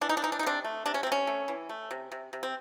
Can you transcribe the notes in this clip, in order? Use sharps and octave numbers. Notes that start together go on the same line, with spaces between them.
E3 D4
D#4
D4
E3 D#4
D4
D#4
C3 C4 D4
A3
C3 D4
C#4
C4
C3
C#4
A3
E3
A3
C3
C3
C3
C4